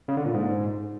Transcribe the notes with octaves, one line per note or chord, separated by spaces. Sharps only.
C#3
D3
A#2
G#2